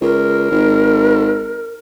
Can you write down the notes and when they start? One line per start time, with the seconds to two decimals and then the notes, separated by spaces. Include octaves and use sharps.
0.01 C#2 A#4
0.50 G#1